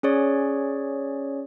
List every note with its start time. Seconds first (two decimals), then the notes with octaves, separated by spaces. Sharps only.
0.03 C#4 G#4 C#5 D5